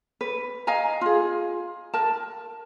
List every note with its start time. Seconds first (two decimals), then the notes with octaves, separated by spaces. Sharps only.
0.21 B4
0.67 D#5 F5 G#5 A#5
1.01 F4 G#4
1.93 A#4 A5